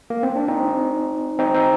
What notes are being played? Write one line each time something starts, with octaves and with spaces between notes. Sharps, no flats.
A#3
C4
D4
C4 D#4
C4 D#4
C4 D#4